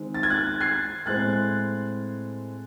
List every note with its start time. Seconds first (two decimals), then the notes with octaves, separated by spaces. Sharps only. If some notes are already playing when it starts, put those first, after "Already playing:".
Already playing: D#3 G#3 C4
0.14 A6
0.23 G#6
0.30 F#6 A6
0.60 G#6 C7
1.06 A2 G#3 C4 F#6 A6